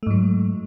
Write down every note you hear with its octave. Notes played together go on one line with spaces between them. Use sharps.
G#2 F#3 A3